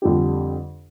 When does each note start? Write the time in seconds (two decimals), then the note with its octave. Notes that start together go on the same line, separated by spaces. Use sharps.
0.02 F2 D3 G3 D4 G4